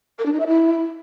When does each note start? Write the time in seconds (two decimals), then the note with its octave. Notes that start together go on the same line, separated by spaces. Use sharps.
0.18 A#4
0.25 D4
0.32 D#4
0.40 E5
0.47 E4